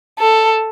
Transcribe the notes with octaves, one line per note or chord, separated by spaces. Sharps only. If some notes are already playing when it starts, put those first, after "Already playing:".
A4